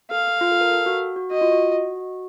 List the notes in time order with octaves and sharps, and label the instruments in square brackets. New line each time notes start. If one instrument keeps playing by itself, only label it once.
[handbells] A4 [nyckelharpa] F5
[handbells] F4
A4
A#4
A4
F#4
F#4
[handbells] F#4 [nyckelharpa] D#5
[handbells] F4
F#4